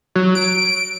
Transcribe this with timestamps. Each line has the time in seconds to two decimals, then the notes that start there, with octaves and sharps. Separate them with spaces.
0.16 F#3
0.35 D7